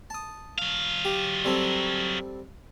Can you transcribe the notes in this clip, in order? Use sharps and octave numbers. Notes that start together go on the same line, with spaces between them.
A5 D#6
F#3 F5
G4
G3 C4 A4